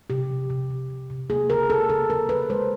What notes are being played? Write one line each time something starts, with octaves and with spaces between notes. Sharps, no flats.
C3 G4
F3
C3
C3
C3
C3
A#3 G#4
C#3 A#4
C#3 A4
C#3 A4
F3 A#4
C#3 B4
G#3 C5